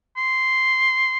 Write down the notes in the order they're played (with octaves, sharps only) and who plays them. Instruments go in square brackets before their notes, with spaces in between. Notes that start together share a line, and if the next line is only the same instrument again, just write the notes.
[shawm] C6